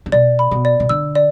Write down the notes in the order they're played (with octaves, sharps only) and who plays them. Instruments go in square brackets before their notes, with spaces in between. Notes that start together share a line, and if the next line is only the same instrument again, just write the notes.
[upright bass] D3
[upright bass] B2 [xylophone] D5
[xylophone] B5
[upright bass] B2
[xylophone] D5
[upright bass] B2
[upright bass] D3 [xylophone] E6
[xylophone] D5